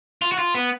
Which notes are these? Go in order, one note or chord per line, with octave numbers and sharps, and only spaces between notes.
F4
F#4
F4
B3